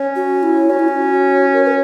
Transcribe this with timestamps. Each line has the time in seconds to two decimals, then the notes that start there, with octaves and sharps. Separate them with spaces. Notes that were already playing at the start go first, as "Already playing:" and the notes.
Already playing: C#4
0.16 F#4
0.43 E4
0.70 C#4 F#4
0.79 E4
0.88 F#4
1.53 A#4
1.65 B4